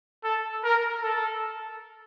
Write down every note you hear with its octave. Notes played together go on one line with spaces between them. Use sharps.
A4
A#4
A4